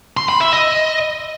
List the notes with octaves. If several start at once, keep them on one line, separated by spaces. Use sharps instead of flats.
C6
B5
E5
D#5